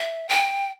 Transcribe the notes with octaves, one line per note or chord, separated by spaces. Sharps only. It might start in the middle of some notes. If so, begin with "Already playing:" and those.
Already playing: E5
G5